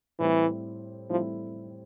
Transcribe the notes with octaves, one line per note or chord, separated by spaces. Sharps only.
A2 E3 G3 C4 E4
A2 F3 G3 C4 E4